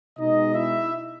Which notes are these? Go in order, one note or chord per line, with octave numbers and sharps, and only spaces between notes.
B2 G#3 D#4 D#5
E4 E5